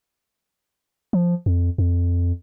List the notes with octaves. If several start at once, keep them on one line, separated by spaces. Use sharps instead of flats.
F3
F2
F2